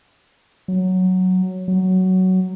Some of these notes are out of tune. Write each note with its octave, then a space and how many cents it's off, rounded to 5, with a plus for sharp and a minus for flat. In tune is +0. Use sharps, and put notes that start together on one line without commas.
F#3 +0
F#3 +10